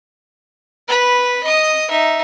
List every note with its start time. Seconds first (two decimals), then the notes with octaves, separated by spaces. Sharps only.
0.88 B4 B5
1.43 D#5 D#6
1.90 D#4 E5